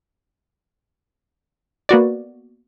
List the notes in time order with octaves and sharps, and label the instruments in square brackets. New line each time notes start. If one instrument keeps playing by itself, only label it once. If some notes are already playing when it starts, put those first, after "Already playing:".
[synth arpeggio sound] A#3 B3 F#4 D5